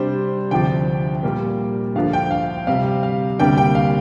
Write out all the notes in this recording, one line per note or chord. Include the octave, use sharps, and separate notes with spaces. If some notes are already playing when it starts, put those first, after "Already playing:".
Already playing: C3 G3 D4 C5
D2 C3 F3 D4 G5
A#2 G3 A#3
D2 D3 F3 F5
G5
F5
C3 G3 C4 F5
F5
D2 C3 G3 A#3 D4 G5
G5
F5